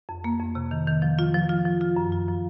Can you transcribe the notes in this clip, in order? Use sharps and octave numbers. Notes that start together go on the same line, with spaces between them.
F2
A#3
F2
C3
D#3
D#3
F3
F4
F3
F4
F3
F4
F#2
F4
F3